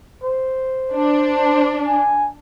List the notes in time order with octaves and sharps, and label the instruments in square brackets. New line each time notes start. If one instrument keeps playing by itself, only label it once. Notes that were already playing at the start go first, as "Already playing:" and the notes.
[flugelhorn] C5
[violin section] D4
[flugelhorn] G#5